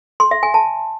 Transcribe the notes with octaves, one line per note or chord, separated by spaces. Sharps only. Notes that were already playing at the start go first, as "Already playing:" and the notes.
C6
E5
G#5
A5